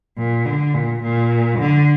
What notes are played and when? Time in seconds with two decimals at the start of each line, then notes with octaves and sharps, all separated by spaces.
0.18 A#2
0.46 D3
0.74 A#2
1.02 A#2
1.59 D3